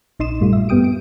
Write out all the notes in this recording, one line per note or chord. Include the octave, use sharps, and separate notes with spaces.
A#1 D#4 D#5 C6 D#6 E7
G2 A#2 G3 A3 F4
E5
G2 B3 G4 G5 D#6 D7
D7